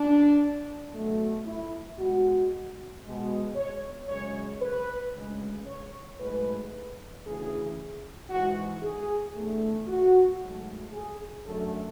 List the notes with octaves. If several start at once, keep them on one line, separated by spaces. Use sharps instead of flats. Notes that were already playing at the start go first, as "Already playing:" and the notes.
Already playing: D4
B2 F#3 A3
E4
B2 G#3 F#4
B2 G#3
C#5
F#2 C#3 G#3 C#5
B4
D2 C#3 G#3
C#5
G#2 F#3 A3 B4
D2 C#3 E3 G#4
G#2 E3 G#3 F#4
G#4
E2 D3 A3
F#4
G#2 F#3 A3
G#4
F#2 D3 F#3 A3 A4